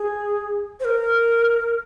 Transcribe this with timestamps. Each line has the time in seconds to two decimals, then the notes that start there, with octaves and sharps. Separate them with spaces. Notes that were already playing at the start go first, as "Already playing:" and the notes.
Already playing: G#4
0.80 C5
0.85 A#4